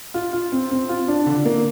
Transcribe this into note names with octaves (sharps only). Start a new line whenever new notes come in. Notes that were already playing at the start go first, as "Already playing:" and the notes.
F4
F4
C4
C4
F4
D4
D3
A#3